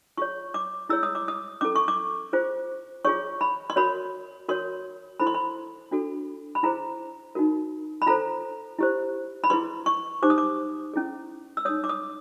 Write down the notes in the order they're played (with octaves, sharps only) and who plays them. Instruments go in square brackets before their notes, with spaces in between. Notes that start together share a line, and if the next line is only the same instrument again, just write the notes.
[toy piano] F4 G#4 C#5 C#6
D6
E4 G#4 C#5 E6
D#6
D6
D#6
C#4 E4 A4 D6
C#6
D6
F4 G#4 C5
F4 G#4 C#5 C#6
B5
C6
F#4 A#4 C#5 B5
F#4 A#4 C#5 C6
E4 A4 C5 B5
C6
B5
D4 F#4 A4
B5
E4 G#4 C5 A#5
D#4 F#4 A#4
B5
F4 A4 C5 A#5
E4 G4 C5
B5
E4 G#4 B4 C6
C#6
D#4 G4 C5 D6
D#6
D6
C#4 E4 G#4
E6
D#4 G#4 C#5 D#6
D6
D#6